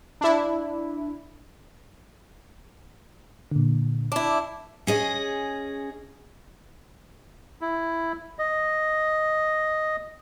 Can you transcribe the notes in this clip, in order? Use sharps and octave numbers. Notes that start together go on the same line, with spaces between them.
D4 E4
A#2 D3
D4 E4 D6
C#4 G#4 D#5
E4
D#5